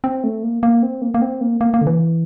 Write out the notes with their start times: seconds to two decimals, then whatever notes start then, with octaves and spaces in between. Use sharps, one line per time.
0.04 C4
0.24 A3
0.43 A#3
0.63 A#3
0.83 C4
1.02 A#3
1.14 A#3
1.22 C4
1.41 A#3
1.61 A#3
1.74 A#3
1.81 D3
1.87 E3